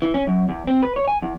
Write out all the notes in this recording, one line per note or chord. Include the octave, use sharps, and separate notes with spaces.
E3
C#4
F#2
E2
C4
B4
C#5
G#5
E2